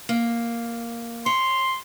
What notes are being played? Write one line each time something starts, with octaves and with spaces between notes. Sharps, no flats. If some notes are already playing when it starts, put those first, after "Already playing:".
A#3
C#5 C6